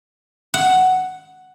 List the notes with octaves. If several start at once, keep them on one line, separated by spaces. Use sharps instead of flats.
F#5